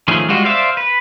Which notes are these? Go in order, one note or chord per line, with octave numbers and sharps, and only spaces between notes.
D#3 F3 A3 C#4 G#4
G3 G#3 F4 F#4
C5 D5 E5 F5
B4